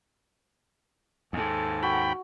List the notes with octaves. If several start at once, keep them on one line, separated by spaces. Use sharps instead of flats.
D#2 G#2 A4 G#5
F#4 G5 B5